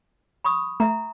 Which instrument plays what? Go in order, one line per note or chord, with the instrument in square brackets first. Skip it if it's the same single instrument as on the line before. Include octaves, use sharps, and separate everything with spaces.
[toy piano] B5 C#6 D#6
[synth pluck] A3 [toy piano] E5 A#5